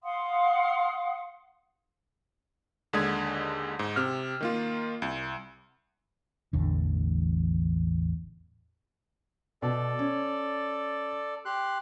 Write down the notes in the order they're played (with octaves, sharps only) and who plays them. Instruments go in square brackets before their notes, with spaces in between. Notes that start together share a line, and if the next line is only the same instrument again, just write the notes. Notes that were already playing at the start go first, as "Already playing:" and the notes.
[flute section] F5 F#5 C6 D#6
[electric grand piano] D#2 D3 G#3 D#6 G#6
G#2
C3 F6
D#3 A#3 F4
C2
[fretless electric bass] A1 E2 D3
[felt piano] B2 [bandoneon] A4 D5
[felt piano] C#4
[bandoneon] G4 C6 F#6